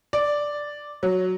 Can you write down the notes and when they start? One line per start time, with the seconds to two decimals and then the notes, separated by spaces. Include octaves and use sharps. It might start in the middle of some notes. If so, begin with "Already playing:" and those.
0.13 D5
1.03 F#3